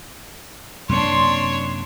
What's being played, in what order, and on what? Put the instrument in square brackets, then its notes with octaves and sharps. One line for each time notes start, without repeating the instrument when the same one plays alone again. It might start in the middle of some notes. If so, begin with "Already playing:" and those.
[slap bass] F#2 C3 A#3 [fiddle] D4 C#5 [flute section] C6